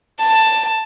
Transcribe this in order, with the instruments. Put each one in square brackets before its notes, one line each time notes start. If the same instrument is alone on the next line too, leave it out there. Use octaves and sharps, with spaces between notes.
[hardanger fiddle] A5